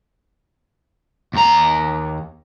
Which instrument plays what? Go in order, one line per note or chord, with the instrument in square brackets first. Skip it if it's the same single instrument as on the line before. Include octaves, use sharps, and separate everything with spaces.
[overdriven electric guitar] D#2 A#5